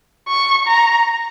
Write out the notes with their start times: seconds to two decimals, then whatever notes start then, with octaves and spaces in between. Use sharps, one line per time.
0.28 C#6
0.67 A#5